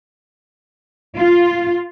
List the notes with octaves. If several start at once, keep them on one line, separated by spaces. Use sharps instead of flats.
F4